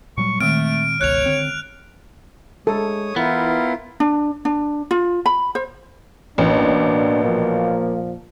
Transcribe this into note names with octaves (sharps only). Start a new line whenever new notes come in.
A#2 F#3 G3 C#6
A#2 D#3 G#3 A3 C4 F6 D7
G1 C#2 B2 C#5 F#6 F7
D3 C4
G#3 A4 C#5 D#6
E3 B3 E4 F4 A#4
D4
D4
F4
B5
C5
A1 B2 A#3 D4
A#2 F3 A#3